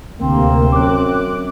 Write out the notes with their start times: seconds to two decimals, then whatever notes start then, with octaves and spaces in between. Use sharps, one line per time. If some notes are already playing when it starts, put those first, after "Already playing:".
0.19 D2 C3 A#3 C4
0.72 F#2 D6 F#6